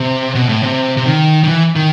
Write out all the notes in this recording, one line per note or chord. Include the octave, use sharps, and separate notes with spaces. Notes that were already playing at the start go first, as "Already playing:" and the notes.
Already playing: C3
B2
A2
C3
C3
D#3
D#3
E3
D#3